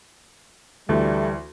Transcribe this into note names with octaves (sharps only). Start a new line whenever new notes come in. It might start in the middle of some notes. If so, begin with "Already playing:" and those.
D2 E3 G3 A3